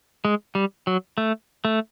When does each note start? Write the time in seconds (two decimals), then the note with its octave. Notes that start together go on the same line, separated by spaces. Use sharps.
0.25 G#3
0.55 G3
0.87 F#3
1.18 A3
1.65 A3